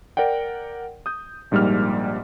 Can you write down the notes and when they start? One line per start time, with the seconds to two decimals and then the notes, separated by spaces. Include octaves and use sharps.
0.17 A#4 D5 F#5 G5
1.06 D#6 G6
1.51 A#1 G#2 G3 A#3 F6